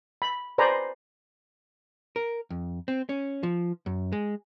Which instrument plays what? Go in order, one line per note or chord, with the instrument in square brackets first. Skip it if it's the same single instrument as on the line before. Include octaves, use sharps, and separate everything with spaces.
[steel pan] B5
B4 C5 D5 G#5 A#5 B5
[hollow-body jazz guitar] A#4
F2
C4
C#4
F3
F#2
G#3